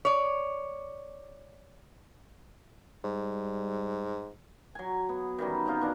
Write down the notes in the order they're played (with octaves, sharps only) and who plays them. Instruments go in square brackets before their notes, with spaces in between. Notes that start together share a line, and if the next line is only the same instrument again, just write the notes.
[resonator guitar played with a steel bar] C#5 D5
[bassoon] G#2 [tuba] G3
[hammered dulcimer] F#3 G#5
B3
D#3 E3 G3 C#4
C4 C#4 D#4 F4
B2 D4 D#5 A#5